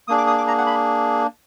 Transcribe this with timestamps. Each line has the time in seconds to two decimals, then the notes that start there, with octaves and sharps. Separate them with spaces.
0.08 A#3 D4 G#4 D#6
0.18 D6
0.27 D#6
0.38 D6
0.48 A#5
0.58 F#5
0.67 B5